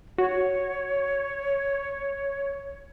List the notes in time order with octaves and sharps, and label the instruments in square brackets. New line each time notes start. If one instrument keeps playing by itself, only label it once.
[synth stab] F#4 [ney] C#5